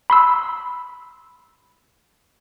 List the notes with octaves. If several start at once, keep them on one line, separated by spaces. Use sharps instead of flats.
B5 C6 E6